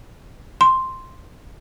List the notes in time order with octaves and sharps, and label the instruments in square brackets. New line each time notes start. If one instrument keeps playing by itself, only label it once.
[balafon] C6